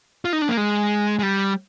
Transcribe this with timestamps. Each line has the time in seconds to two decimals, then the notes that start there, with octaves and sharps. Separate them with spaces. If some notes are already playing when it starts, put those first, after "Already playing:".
0.25 F4
0.33 D#4
0.42 D4
0.49 A#3
0.57 G#3
1.19 G#3
1.23 G3